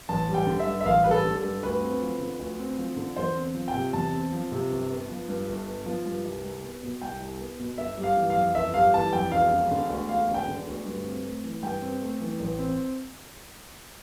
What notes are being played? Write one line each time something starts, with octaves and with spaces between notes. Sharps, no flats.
A1 A5
G3
G5
D3
E5
G2
E5
A1 F5
G3 B4
A4
D3
A4
G2
D2 B4
C4
F3
D3
D2
C4
F3
D3
E2 C5
C4
F3
G5
C3
E2 A5
C4
F3
C3
G1
B3
F3
G2
G1
B3
F3
G2
C2
C2
B3
B2
C2 G5
C2
B3
B2
G1 E5
G3
F5
E3
F5
F2
G1 E5
G3 F5
E3 A5
F2 G5
E1 F5
E1
D3
D2
E1 F5
E1
G5
D3
D2
G2
C4
A3
E3
G2 G5
C4
A3
E3
A1
C4